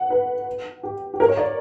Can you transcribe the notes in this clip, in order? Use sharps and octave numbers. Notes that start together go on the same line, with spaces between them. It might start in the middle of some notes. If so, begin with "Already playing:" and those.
Already playing: F#5
B4
G4
G4
A#4
C#5
D5